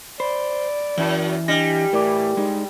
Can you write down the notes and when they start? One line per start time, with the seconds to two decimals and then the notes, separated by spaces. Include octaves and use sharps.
0.20 C5 D5 B5
0.98 F#2 E3 E4
1.48 G3 D4 D#5 G#5 A#6
1.93 A2 E3 A#4 D5 D6
2.37 G3 G#3 D#4